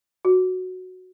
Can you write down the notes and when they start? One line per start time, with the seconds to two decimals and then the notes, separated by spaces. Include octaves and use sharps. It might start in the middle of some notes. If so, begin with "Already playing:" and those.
0.25 F#4